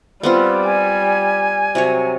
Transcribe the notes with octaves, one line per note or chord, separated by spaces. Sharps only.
G3 B3 C4 F4
G#5
C3 F#3 C#5